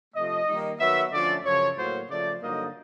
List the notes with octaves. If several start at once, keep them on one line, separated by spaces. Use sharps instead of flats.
C3 F3 A3 D#5
D#3 G3 A#3 D#4
D#3 F#3 B3 E5
D3 F3 A3 C#4 D5
F#2 C#3 F3 C#5
A2 F#3 A#3 C5
C#3 F3 A3 D5
G2 D3 F#3 A#3 D#4 D#5